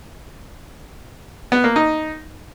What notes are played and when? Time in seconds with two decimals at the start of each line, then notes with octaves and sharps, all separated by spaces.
1.52 B3
1.64 A#3
1.76 D#4